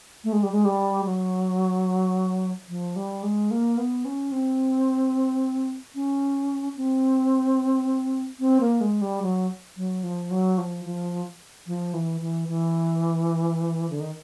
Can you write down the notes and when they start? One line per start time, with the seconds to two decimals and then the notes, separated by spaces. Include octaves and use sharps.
0.24 A3
0.33 G#3
0.43 G3
0.52 G#3
0.65 G3
1.05 F#3
2.69 F3
2.96 G3
3.23 G#3
3.51 A#3
3.78 B3
4.05 C#4
4.32 C4
5.95 C#4
6.77 C4
8.40 C4
8.61 A#3
8.81 G#3
9.01 G3
9.22 F#3
9.77 F#3
10.03 F3
10.31 F#3
10.58 F3
10.85 F3
11.67 F3
11.94 E3
12.21 E3
12.48 E3
13.90 D3
14.01 D#3